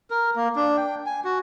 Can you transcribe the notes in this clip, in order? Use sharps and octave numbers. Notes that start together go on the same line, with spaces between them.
A#4
A#3
D4
G5
G#5
F#4